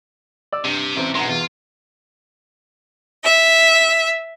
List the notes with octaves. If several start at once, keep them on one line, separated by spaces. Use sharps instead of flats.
D5 E6
G2 C3
A1 C4
B1 A2 G#3 A#5 C6
E2 F4
E5